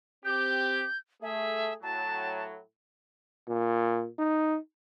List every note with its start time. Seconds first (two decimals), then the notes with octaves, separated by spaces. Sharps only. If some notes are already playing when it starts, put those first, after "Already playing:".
0.25 C4 G4 G6
1.22 A3 G#4 E5
1.83 A2 F#3 A5
3.48 A#2
4.19 D#4